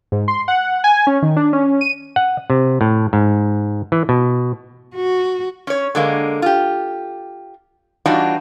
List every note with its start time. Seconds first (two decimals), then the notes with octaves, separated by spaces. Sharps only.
0.12 G#2
0.28 C6
0.48 F#5
0.84 G#5
1.07 C#4
1.22 D#3
1.37 D4
1.53 C#4
1.81 D#7
2.16 F#5
2.50 C3
2.81 A2
3.13 G#2
3.92 E3
4.09 B2
4.95 F#4
5.67 C#4 C#5
5.95 D3 G#3 A#3
6.42 F4 G4
8.06 E3 G3 D4 D#4 F4 F#4